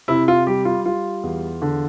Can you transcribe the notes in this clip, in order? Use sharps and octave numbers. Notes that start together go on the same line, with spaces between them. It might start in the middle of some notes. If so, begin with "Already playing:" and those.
C3 E4
F4
G3 G4
F4
G3 F4
E2
D3